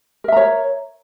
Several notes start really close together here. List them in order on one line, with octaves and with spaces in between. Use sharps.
A#4 E5 A#5 C#5